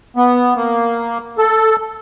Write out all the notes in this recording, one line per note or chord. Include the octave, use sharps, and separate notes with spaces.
B3
A#3
A4